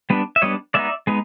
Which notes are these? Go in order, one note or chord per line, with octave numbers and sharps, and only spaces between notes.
G3 B3 D4
E5
G3 B3 D4 C#5 D#5
G#3 B3 D#4 D5 E5
G#3 B3 D#4